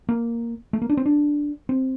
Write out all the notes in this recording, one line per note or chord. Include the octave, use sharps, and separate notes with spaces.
A#3
A3
A#3
D4
C4
D4
C4